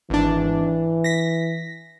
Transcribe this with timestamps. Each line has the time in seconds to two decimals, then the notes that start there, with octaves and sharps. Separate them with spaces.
0.10 G#1 E3 D4
1.04 A#6 B6